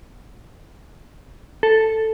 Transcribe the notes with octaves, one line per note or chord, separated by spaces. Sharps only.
A4